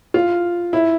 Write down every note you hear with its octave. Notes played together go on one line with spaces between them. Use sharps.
F4
E4